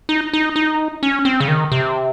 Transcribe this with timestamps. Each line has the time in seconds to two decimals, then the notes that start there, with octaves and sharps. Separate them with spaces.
0.09 D#4
0.33 D#4
0.56 D#4
1.03 C#4
1.25 C4
1.40 C#3
1.48 D#3
1.72 C3